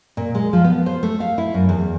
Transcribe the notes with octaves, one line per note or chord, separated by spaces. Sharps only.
A#2
G#3
F3
B3
C5
A3
F5
E4
F#2
E2